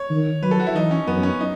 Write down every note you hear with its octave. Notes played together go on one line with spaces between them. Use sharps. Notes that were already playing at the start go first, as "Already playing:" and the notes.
Already playing: C#5
D#3
F#3 B4
A4
F#4
E4
E3 D#4
C#4
F#2 B3
C#4
D#4